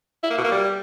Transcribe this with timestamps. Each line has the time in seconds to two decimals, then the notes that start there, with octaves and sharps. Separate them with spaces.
0.23 E4
0.30 A#3
0.37 B2
0.44 A#3
0.51 G3